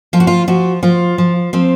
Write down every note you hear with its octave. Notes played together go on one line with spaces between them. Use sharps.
F3 F4
F#4
F4
F3 F#4
F3 F4
F3
F3 C4